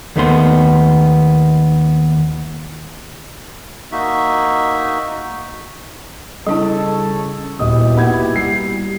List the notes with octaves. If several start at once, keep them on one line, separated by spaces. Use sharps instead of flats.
D#2 D#3 A3 B3 F5 C6
A#3 D#4 F#4 E5
C#3 G3 D4 E4 A4 C#5 A5
D#1 B2 E4 G4 D#5 D#6
A#3 D#4 F#5 G#6
G3 C7